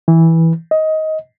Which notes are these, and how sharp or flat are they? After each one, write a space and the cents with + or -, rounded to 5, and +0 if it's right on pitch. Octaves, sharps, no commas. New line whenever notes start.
E3 -10
D#5 +15